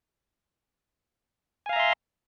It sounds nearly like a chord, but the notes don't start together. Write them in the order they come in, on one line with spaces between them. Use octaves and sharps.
G#5 F5 A#5 E5 C6